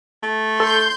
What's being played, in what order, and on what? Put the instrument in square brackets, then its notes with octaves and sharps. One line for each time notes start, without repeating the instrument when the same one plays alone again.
[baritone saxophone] A3
[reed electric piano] A4 [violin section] C6 G6